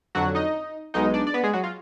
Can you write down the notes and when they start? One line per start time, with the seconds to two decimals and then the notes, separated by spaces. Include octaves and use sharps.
0.15 F2 D3 F#3 F#4 F#5
0.35 D#4 D#5
0.94 B1 B2 G#3 D#4 D#5
1.14 D4 D5
1.27 D5
1.34 B3 B4
1.44 G#3 G#4
1.53 F#3 F#4
1.64 F4